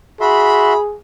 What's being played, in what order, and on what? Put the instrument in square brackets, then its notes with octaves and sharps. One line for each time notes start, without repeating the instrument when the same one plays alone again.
[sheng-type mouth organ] F#4 E5 C6 [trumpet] G#4 [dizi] B5